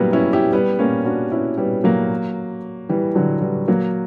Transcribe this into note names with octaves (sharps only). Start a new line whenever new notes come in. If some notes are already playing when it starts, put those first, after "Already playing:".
Already playing: F#3 G3 A#3 B3 C#4 E4
C#4 E4
E4 G4
G3 B3
A#3 C#4
D4 F#4
C#4 E4
G3 B3
F#3 A#3
E3 G3
D3 F#3
E3 G3
F#3 A#3